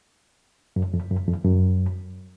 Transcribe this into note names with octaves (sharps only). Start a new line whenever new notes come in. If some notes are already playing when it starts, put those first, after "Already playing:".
F#2
F2
F#2
F2
F#2